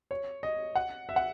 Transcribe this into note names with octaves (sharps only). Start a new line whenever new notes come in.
C#5
D#5
F#5
E5
F#5